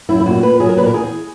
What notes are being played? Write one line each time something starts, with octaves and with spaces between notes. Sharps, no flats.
F#2 E4
E4
A#2 F#4
A#2 B4
F#3 G#4
A#4
A#2 B4
A#4
E2 G#4